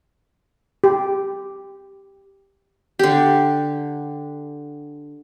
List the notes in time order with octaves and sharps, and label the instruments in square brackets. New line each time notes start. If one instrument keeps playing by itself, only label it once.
[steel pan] G4
[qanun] D3 G4